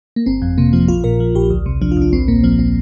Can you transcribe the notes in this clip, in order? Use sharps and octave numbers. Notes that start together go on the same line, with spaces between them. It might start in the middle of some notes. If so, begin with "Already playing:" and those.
A#3
G1 C4
F2
C3 A#3
F3 C4
A#1 F4
A#2 A#4
F3
A#1 G4
D2
C3
F3 D4
F4
D2 D4
A#1 C4
A#2 A#3
F3 C4
C4